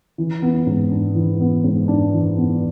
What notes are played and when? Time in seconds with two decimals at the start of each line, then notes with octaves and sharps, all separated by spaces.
0.18 E3
0.42 B3
0.66 G#2
0.91 D4
1.15 E3
1.40 B3
1.64 G#2
1.88 D4
2.13 E3
2.37 B3